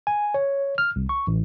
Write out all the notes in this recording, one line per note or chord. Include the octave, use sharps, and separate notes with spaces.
G#5
C#5
F6
C2
C#6
A1